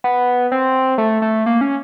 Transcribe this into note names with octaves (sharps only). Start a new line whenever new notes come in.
B3
C4
A3
A3
A#3
C#4